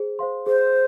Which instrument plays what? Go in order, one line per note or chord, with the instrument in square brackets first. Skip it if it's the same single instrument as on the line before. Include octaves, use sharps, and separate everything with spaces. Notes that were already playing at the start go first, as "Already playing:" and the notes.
Already playing: [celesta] G#4 C5
C5 F5 C6
[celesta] G#4 [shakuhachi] C5